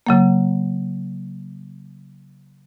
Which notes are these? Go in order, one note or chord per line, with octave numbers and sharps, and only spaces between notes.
C#3 F#3 A#3